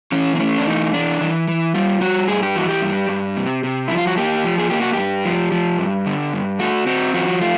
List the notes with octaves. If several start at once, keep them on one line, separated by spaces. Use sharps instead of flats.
E3 C#4
C4
A3 C#4
D4
E3 D#4
E3 D4
E3
E3
G3 F4
G3 F#4
G2 G#4
G4
E3 F#4
G4
G2
G2
C3
C3
F3 E4
F4
F#4
A#3 G4
F3
G#4
A#3 G4
F#4
G2 G4
F3
F3
G2
D3
G2
A3 F#4
C4 F#4
F3 F#4
A3 F4